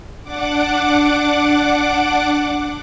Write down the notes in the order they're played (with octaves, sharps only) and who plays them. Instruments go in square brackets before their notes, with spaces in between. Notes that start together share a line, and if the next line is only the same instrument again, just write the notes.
[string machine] D4 F#5 D6